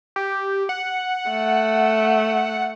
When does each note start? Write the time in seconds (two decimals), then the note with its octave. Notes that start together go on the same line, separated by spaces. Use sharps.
0.16 G4
0.69 F#5
1.30 A3